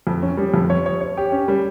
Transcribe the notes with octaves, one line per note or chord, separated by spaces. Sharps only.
F2
C#4
G3
F2
C#5
C#5
C#5
G4
C#4
G3